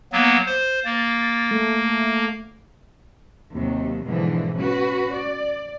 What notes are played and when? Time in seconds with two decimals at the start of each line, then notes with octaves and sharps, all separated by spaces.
0.13 F#3 A#3 B3
0.46 C5
0.85 A#3 A6
1.51 A3
3.53 D#2 C3 F#3
4.05 G#2 B2 D3 E3 F3
4.55 C#4 F#4 B4
5.13 D5